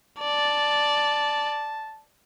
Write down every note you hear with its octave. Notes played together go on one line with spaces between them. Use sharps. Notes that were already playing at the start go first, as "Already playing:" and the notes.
D5 A5